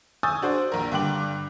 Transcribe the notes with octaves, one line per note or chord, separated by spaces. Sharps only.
G#5 C#6 D#6 E6 G6 A6
D4 F#4 C5
A#1 A#4
G2 D3 G5 D6 F#7